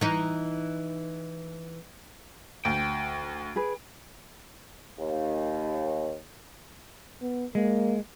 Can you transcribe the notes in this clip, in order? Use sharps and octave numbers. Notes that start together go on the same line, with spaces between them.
E3 D#4
D2 G5
G#4 B4
D#2
B3
G#3 A#3